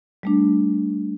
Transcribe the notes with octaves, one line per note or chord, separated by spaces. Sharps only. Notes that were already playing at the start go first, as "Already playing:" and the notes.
G3 A3 D4